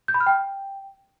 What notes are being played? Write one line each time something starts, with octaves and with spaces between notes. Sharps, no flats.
G6
B5
F6
G5